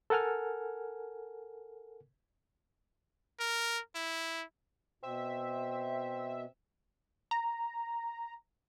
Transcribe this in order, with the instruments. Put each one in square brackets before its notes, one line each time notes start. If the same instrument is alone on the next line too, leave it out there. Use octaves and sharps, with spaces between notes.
[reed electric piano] A4 A#4 F#5 G#5 F6
[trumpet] A#4
E4
[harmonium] B2 [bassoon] C4 [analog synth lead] E5
[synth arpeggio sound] A#5